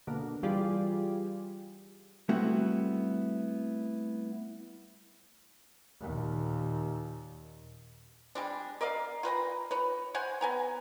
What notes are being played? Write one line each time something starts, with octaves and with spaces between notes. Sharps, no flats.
B2 D3 A#3
E3 G3 F4 G4 G#4 D5
G3 A3 B3 C4 E4 F#4
D#2 A#2
G3 G#3 D4
A#4 D5 D#5 F5
F4 B4 G5 A#5
B4 C#5
C5 C#5 F#5 G#5
B3 G#5 A#5